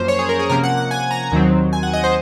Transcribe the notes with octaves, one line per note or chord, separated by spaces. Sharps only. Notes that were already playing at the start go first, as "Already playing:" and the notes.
Already playing: F#2 F3 A#3 C#4 C5
C#5
G#4
A#4
G#4
C3 F3 A#3 C#4 A#4
F#5
F#5
G#5
A#5
D#2 D#3 F#3 C4
G#5
F#5
D#5
C5